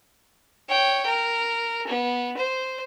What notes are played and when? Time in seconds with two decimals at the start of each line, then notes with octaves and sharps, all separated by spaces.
0.69 C#5 G5
1.06 A#4
1.87 B3
2.37 C5